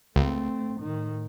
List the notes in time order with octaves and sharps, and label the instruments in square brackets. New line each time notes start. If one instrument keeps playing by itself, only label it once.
[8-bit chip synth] C#2 [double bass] A3 C4
[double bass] A2 D#3